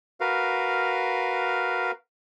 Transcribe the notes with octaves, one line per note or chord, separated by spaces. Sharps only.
F#4 A#4 B4 F5